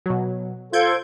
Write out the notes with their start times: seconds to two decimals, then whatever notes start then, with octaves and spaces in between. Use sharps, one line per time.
0.06 B2 F#3
0.73 F4 A4 C5 G6 G#6 D7